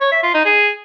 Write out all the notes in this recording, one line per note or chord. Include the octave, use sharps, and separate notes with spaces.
C#5
E5
F4
D#4
G#4